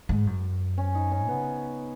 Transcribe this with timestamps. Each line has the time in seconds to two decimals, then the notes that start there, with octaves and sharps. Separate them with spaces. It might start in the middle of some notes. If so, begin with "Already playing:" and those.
0.09 G#2
0.27 F#2
0.78 C#4
0.95 D#4
1.12 C#4
1.28 C#3 B3